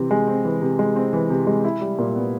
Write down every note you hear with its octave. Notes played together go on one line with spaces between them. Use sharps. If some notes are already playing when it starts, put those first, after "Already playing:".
Already playing: C3 E3 C4
G#3
C4
E3
C3
G#3
C4
E3
C3
G#3
E4
G3
A#2
B3